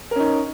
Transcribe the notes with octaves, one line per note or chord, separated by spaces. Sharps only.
C#4 D#4 A#4